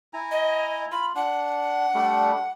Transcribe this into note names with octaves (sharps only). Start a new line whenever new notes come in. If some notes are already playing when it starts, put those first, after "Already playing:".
E4 G#5 A#5
D#5
F4 B5
D4 F#5
G3 A3 D4